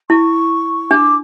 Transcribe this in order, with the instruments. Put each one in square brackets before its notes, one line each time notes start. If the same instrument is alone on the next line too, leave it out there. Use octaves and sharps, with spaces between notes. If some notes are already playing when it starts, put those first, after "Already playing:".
[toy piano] E4 [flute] C#6
[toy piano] D4 [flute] D6